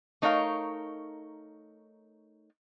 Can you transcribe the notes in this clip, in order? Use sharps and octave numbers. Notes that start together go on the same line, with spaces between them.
A3 D#4 A#4 C#5 D5 F5